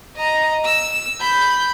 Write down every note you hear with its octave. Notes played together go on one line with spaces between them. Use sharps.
D#5 A#5
E6
B5 G6